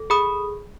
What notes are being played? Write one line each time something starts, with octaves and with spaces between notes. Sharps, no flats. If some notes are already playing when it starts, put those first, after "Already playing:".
Already playing: A4
G#4 B5 D#6